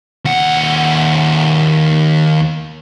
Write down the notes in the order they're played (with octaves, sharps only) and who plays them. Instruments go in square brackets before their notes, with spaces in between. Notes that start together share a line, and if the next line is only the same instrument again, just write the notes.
[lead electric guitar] D#2 F#5